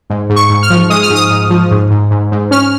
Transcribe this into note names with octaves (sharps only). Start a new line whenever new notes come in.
G#2
G#2
C#6
G#2
F6
F3
G#3 D#6
F6
G#2
D#6
G#2
F3
G#2
G#2
G#2
G#2
C#4 F6